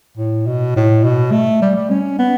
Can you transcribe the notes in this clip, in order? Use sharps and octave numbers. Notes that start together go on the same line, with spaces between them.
A2
B2
A2
B2
A3
G3
G3
C#4
B3